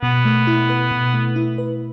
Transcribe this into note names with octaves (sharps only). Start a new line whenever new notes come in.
B2 B3
A3
E4
B4
B2
A3
E4
B4